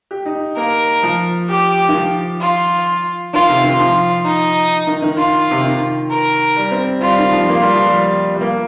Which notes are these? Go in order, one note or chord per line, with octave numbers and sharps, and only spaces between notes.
G4
D#4
A#3 A#4
F3
G4
D#3
F3
F4
D#3 F4
C3
D#3
F3 F4
D#4
D#3
D#3
F4
C3
D#3
A#4
G3
C4
G3 F4
D#3
F3
A#3 F4
G3
F3
G3
G3
A#3